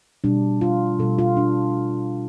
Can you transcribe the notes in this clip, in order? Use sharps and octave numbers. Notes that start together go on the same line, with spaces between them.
B2 G3 D4
F4
B2 G3 A4
F4
D4